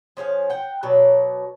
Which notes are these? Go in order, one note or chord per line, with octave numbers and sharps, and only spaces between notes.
F3 C#4 G#4 F5
F#5 G5
B2 F#3 C#5 D5